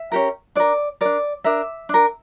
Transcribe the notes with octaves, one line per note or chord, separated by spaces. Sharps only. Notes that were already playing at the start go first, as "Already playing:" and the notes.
Already playing: E5
C#4 G4 A#4
D4 A#4 D5
D4 A#4 D5
D4 A#4 E5
D4 A#4